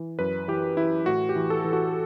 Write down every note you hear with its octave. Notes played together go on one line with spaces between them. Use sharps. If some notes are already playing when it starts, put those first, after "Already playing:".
Already playing: E3
F#2 B4
E3 G4
E3 E4
A2 F#4
G4
E3
A4
E3
F#4